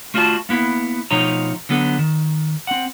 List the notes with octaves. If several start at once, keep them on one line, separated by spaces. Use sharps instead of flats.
A3 F4 F#4 C5 D5 A5
A#3 B3 E4
B2 F3 A3 D#4 C#5 A#5
D3 F#3 B3 A4
D#3
C4 F#5